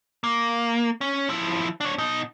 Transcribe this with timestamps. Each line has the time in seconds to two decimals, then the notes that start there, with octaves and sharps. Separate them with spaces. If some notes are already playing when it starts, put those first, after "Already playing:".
0.24 A#3
1.01 C#4
1.29 F3 E4
1.81 D4 C#5
1.98 B2 D#4